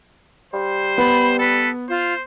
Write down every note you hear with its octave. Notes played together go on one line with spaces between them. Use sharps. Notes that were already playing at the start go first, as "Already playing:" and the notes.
G3 C5
B3 B5
A4 B4
F4 C5